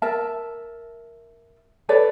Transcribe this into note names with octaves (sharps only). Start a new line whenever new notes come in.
A#4 E5 A5
A4 B4 C#5 D5